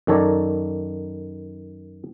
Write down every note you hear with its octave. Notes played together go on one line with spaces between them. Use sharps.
F#2 D#3 A4 C#5 D5 A#5